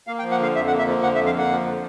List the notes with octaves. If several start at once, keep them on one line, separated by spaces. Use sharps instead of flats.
A#3 F5
G5
F3
F#5
D3 F5
F2 E5
F#5
A#3
E5
F3
D3 F#5
E5
F2
F5
A#3 F#5
F3
D3